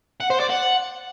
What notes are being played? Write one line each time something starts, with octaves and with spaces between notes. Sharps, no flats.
F#5
C5
D5
F#5